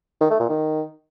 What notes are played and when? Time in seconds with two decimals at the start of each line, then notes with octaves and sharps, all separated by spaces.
0.21 D#3
0.30 A3
0.40 A#2
0.49 D#3